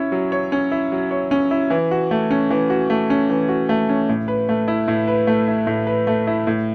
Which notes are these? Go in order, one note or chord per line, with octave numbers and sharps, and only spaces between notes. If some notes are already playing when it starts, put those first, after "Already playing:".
Already playing: C#4 E4 C#5
F#3
C#5
C#4
E4
F#3
C#5
C#4
E4
E3
F#4
A3
C#4
E3
F#4
A3
C#4
E3
F#4
A3
C#4
A2
B4
A3
E4
A2
B4
A3
E4
A2
B4
A3
E4
A2